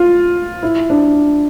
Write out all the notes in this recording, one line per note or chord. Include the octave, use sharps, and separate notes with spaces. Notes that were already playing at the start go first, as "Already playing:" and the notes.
Already playing: F4
E4
D4